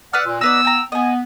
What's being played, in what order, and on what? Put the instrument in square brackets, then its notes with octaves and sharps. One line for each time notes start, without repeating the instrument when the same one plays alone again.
[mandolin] B4 E6 F6 [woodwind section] D5 F#5
[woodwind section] A#2
[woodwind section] B3 E6 [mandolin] D#4 B4 D5
[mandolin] G5 A#5
[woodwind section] B3 [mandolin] D#5 G#5